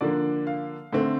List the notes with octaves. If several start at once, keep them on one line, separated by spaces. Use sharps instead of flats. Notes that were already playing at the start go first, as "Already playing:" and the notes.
D3 F3 A#3 D4 D5
F5
D3 A3 C4